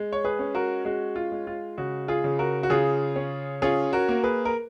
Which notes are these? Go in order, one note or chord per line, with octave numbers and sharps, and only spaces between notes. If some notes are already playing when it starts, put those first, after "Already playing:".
Already playing: G#3
C#5
G#4 B4
C#4
F#4 A#4
G#3 F#4
F4
G#3
F4
C#3 F#4
F4 G#4
C#3
F#4 A#4
F#4
C#3 F4 G#4
C#4
C#4 F4 G#4
F#4 A#4
A#3
G#4 B4
A#4